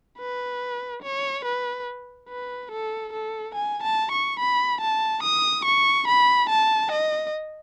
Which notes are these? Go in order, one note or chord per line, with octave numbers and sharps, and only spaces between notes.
B4
C#5
B4
B4
A4
A4
G#5
A5
C#6
B5
A5
D#6
C#6
B5
A5
D#5